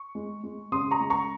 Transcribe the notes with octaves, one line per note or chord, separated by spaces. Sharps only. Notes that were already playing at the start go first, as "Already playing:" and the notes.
Already playing: C#6
G#3
G#3
C#3 C6 D#6
A#5 C#6
G#3
A#5 C#6